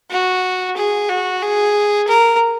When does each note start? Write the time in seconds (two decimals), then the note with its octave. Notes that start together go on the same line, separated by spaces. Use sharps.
0.10 F#4
0.76 G#4
1.09 F#4
1.42 G#4
2.07 A#4